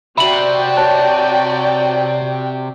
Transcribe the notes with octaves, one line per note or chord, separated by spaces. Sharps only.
C3 F#4 D5 E5 G5 B5 F#7
C#5 A5 F#6